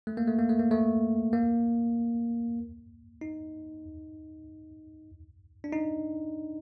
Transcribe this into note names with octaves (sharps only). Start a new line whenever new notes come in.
A3
A#3
A3
A#3
A3
A#3
A3
A#3
D#4
D4
D#4